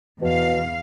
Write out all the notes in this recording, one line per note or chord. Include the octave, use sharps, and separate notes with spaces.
E2 B2 F5